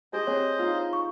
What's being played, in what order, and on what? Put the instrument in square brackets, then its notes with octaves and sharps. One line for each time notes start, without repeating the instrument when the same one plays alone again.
[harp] G4 G#4 [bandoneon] C5 D#5
[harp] C4 G#4 [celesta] C#5
[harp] D#4 F4
[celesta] C#6